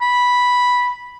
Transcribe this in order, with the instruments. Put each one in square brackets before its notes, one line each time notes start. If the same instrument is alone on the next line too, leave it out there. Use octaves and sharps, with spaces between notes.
[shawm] B5